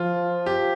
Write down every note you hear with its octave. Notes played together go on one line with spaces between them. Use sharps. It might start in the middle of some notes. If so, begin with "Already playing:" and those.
Already playing: F3 F4
G4